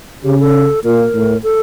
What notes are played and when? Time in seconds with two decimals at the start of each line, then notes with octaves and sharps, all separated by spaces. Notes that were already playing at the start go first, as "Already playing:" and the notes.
0.24 C#3 G4
0.40 A4
0.84 A#2 A#4
1.14 A2
1.43 A4